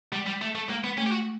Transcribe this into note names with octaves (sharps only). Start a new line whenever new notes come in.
G3 G#3
G3
A3
A3
G#3 A#3
B3
A3 C#4
G4
F#4